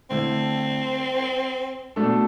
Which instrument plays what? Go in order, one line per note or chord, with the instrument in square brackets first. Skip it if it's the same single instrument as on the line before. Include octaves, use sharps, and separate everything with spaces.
[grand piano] D3 A3 E4 [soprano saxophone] C4
[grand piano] B2 A3 D4 A4